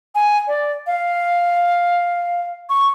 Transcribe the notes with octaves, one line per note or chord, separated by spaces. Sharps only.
G#5
D5
F5
C#6